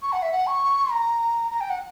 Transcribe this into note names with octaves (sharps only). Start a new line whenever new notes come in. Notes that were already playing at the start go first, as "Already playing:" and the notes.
C#6
F#5
E5
F#5
C#6
A#5
A#5
G5
F#5